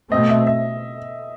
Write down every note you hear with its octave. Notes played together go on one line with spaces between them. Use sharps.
B2 A3 C4 D#5
E5
E5